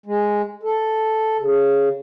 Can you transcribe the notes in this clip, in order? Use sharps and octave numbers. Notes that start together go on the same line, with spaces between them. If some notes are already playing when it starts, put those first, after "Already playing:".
G#3
A4
C#3